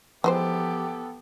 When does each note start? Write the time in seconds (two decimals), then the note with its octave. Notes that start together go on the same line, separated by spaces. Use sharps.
0.24 E3 F3 G#3 B3 G4 A4 C5